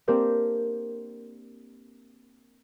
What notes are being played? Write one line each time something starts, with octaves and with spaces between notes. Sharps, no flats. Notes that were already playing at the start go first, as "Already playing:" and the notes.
A#3 C4 D4 G4 A#4